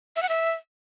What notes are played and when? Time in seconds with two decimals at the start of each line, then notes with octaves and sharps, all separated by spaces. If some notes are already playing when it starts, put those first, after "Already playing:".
0.16 E5
0.23 F#5
0.29 E5